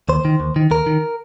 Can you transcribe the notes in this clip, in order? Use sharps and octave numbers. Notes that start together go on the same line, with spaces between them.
D#2 C5
D#3
D#2
D#3
D#2 A#4
D#3